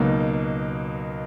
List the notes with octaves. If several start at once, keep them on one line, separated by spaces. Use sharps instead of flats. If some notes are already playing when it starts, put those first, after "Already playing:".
Already playing: C#2 B2 F#3 A#3 D#4